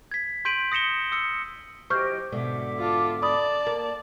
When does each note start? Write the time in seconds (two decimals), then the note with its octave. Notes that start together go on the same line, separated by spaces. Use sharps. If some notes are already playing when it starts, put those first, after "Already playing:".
0.11 G#6 B6
0.45 C6 G6 B6 D7 D#7 F#7
0.72 D#6 A#6 C#7 E7 G7
1.12 D#6 E6 C#7
1.90 F#3 E4 G4 C5 D#5 C#6 F6 G6
2.32 G#2 B2 D3 E5 D6
2.79 F4 A4
3.23 D5 A5 B5 D#6
3.67 A#3